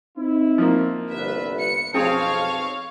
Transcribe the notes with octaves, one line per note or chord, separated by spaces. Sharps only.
C4 D#4 E4
F3 A#3
G1 C2 B4 E5
C#7
B1 F2 C4 G#4 C#5 F5 A5